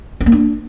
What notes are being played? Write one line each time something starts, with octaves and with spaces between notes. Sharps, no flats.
C#4
A#3
D4